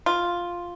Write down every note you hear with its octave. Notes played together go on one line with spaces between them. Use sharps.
F4